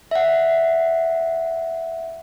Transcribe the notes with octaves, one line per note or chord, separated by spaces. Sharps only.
E5 F#5